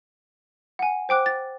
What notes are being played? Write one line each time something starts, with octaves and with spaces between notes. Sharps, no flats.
F#5 G#5
C5 G5 D6 F#6
A6